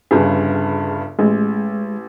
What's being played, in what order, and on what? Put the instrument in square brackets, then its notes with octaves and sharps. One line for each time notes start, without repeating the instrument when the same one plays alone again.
[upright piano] G1 G2 C#3 [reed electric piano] G#4
[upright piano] A1 [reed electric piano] G#3